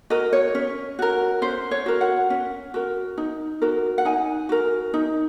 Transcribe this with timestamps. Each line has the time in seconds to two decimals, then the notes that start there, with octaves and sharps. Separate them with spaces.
0.10 F#4 A#4 D#5
0.33 C#5
0.55 C#4
0.99 F#4 A#4
1.42 C#4 C5
1.71 C#5
1.86 F#4 A#4
2.01 F#5
2.30 C#4
2.74 F#4 A#4
3.18 D#4
3.62 F#4 A#4
3.98 F#5
4.05 D#4 G#5
4.49 F#4 A#4
4.94 D#4